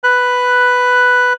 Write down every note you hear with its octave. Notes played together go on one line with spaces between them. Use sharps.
B4 F#6